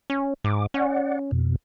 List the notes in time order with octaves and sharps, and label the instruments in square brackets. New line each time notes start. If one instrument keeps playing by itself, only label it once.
[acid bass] C#4
[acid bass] G#2 [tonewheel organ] D6
[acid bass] C#4 [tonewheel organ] D5 F#5
[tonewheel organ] F2 B2